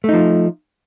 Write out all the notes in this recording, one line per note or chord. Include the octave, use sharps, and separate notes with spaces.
F3 A3 D#4